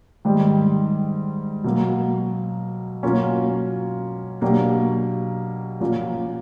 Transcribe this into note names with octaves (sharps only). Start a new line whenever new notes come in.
G#2 D#3 G3
B2 F#3 A#3
B2 F#3 A#3 C#4 F4
B2 F#3 A#3 D4 G4
A#2 F3 A#3 C#4